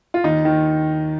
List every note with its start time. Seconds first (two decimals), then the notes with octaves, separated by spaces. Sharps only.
0.14 F4
0.24 D#2 D#4
0.45 D#3